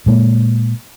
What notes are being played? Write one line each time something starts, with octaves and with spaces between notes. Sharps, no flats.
A#2 G#3 A#3